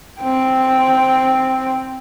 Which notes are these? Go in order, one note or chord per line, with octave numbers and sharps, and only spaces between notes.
C4 G5